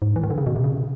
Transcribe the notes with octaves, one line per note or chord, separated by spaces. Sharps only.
G#2
E3
D#3
D3
C#3
B2
C3
C#3